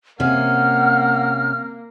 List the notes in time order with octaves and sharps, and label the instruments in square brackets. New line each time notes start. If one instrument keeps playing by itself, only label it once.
[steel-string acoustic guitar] C3 C#4 [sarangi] A#3 [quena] F#5 [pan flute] F6